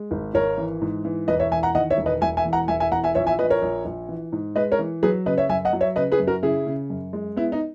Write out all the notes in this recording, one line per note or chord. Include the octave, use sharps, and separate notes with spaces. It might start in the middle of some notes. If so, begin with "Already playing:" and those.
Already playing: G#3
G#1
G#1 A#4 C#5
E3
G#2
E3
E1 B4 D#5
C#5 E5
E2 E5 G#5
F#5 A#5
D#3 D#5 F#5
C#5 E5
E1
B4 D#5
E1 E5 G#5
E5 G#5
E2
F#5 A#5
E1 E5 G#5
E5 G#5
E2 F#5 A#5
E5 G#5
A#1 C#5 E5
E5 G#5
A#1 B4 D#5
A#4 C#5
A#1
A#1
E3
G#2
G#3 B4 D#5
A#4 C#5
E3
F#3 G#4 B4
C#3 B4 D#5
C#5 E5
F#2 E5 G#5
D#5 F#5
F#3
C#5 E5
C#3 B4 D#5
G#4 B4
F#2
F#4 A#4
C#3 E4 G#4
C#3
F#2
G#3
B3 E4
D#4